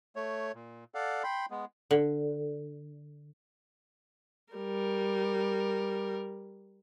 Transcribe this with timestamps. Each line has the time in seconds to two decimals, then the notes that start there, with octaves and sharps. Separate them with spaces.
0.16 A3 C#5
0.55 A#2
0.95 A4 D5 F5 F#5
1.24 G5 B5 C6
1.51 G#3 B3
1.91 D3
4.54 G3 A#4